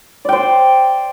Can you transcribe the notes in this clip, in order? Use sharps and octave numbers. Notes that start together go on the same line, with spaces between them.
C5 D5 G5